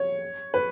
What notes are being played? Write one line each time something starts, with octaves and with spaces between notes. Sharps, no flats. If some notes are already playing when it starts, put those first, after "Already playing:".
Already playing: C#5
B4